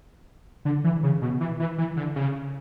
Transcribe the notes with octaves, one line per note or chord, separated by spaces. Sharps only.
D3
E3
C#3
B2
E3
E3
E3
D3
C#3